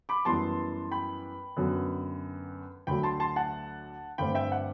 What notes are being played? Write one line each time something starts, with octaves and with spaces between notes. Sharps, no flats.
B5 D6
F#2 E3 G3 B3 A5 C6
G5 B5
F#2 D3 F#3 B3
D2 D3 F#3 A3 G5 B5
A5 C6
A5 C6
F#5 A5
G2 D3 A3 C4 G5 B5
E5 G5
F#5